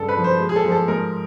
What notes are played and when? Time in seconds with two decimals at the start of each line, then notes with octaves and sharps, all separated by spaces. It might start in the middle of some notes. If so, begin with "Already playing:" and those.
Already playing: G2 C#3 A4
0.09 B4
0.17 F3
0.24 C5
0.40 G#3
0.49 G#4
0.56 A4
0.65 F3
0.72 A4
0.88 G#2 A#4